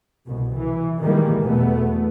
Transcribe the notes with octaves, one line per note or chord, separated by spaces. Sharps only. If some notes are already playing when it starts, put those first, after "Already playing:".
C2 B2
E3
A#2 D#3 E3 G3 G#3 A#3
E2 B2 A3 B3